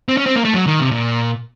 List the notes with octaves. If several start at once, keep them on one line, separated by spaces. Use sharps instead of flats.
C4
C#4
C4
A#3
A3
F#3
D#3
C3
A#2